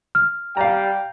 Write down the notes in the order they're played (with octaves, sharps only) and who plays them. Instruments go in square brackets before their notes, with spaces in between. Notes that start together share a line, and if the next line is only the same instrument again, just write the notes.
[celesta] F6
[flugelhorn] G3 [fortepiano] F5 A#5 [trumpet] G5